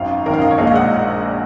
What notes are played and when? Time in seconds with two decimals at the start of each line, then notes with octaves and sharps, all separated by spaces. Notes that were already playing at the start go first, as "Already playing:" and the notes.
Already playing: G#1 F#2 D#3 F5
0.26 G#1 F#2 D#3 A#4
0.34 F5
0.42 D#5
0.51 C#5
0.58 A#1 A#2 G#3 F5
0.67 D#5
0.75 F#5